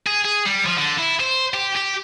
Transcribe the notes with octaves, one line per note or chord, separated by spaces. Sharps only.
G#4
G#4
G3
F3
D3
E4
C5
G4
G4